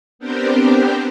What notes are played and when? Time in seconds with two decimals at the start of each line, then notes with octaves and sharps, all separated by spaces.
0.19 B3 C4 D4 G4 A#4 C5